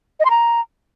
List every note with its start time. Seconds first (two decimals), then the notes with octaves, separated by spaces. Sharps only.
0.20 D#5
0.25 C6
0.30 A#5